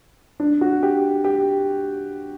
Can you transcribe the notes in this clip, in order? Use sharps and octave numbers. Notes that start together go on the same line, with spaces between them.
D4
F#4
G4
G4